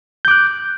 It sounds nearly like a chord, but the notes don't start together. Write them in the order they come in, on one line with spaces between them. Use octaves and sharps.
G6 D6 F#6